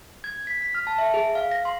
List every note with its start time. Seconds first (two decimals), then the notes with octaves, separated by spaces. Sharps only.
0.24 G#6
0.47 B6
0.62 B6
0.75 F6
0.87 A5
0.98 E5
1.14 G#4
1.35 F5
1.51 A#6
1.65 C6